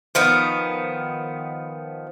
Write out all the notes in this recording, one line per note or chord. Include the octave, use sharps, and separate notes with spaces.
D#3 F3 B3